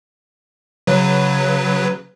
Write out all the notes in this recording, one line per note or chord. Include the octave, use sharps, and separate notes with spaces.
C#3 F#3 B4